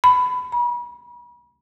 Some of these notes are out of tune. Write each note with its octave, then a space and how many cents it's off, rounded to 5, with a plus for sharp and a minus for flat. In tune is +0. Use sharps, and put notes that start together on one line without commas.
B5 +20
B5 -40